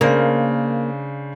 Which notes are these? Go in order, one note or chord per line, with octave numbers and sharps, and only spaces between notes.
C#3 A#3 D4 C5